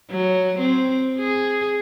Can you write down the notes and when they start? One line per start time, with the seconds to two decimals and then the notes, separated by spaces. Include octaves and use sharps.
0.11 F#3
0.59 C4
1.18 G#4